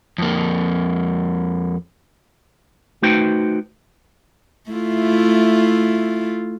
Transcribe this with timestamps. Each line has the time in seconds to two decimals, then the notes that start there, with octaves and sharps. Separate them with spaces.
0.18 F2 A#3
3.02 A3 D#4 F#4 B4 C5 G5
4.70 A3 E4 F4